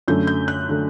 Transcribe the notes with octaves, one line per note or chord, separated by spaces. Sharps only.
F#2 D3 A3 G6
G6
F#6
D3 A3